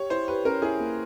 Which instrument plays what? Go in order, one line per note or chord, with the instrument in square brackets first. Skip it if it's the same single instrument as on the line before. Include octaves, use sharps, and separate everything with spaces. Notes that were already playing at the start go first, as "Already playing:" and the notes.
Already playing: [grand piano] G4 [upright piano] C#5
[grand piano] E4 [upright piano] C5
[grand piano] G4 [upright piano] B4
[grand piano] C#4 [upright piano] A#4
[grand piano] E4 [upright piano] G#4
[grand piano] A#3